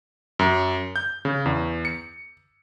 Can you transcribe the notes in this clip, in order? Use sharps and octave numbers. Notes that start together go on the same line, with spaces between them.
F#2
G6
C#3
E2
C#7